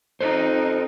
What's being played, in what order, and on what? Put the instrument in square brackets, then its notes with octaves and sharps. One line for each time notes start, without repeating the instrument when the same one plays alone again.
[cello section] C4 D#4 [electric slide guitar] A4 C5